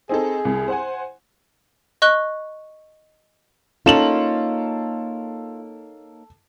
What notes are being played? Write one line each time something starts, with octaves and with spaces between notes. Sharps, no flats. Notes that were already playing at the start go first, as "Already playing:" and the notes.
C4 D#4 G#4 A4
C2
C5 F#5 G#5
D#5 C#6 F#6 G7
A#3 C#4 D#4 F4 A4 E7 F#7